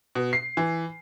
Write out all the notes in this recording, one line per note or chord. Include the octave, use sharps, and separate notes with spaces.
B2
C7
E3